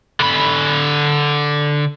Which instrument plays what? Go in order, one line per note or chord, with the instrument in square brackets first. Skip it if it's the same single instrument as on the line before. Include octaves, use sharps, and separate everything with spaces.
[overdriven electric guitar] D3 B5